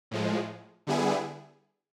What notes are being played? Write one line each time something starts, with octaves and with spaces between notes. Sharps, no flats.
A2 F3 G#3
D3 G3 B3 E4 G#4